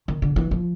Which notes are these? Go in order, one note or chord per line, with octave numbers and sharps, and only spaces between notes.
D#3
D3
E3
F3